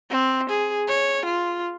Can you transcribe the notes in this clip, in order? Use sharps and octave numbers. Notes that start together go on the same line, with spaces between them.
C4
G#4
C#5
F4